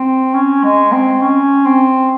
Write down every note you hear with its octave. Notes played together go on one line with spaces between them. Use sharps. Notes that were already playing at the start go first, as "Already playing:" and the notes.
Already playing: C4
C#4
G#3
C4
C#4
C4